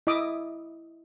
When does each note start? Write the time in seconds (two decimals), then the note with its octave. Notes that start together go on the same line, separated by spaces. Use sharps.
0.07 E4 D#5 E5 D6 D#6